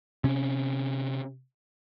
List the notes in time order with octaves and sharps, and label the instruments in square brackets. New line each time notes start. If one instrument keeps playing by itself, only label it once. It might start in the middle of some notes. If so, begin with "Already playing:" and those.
[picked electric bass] C3 C#4